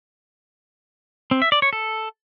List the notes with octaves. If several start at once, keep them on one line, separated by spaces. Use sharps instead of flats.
C4
E5
D5
C#5
A4